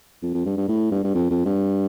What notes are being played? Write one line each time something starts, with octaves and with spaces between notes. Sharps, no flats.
F2
F2
G2
G2
A2
G2
G2
F2
F2
G2